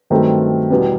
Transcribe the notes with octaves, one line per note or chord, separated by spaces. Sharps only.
G2 D#3 F#3 A3 C4
E2 B2 G3 B3